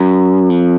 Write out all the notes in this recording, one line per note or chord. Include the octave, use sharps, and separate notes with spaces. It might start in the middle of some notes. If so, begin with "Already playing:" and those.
Already playing: F#2
F2